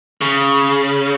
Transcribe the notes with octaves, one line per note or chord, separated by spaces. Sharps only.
C#3